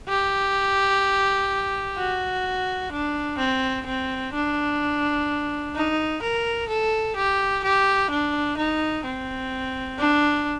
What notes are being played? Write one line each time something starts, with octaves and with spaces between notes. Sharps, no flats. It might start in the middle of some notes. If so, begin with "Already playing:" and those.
G4
F#4
D4
C4
C4
D4
D#4
A#4
A4
G4
G4
D4
D#4
C4
D4